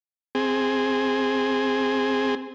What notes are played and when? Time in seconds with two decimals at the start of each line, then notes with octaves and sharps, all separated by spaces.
0.35 C4 G#4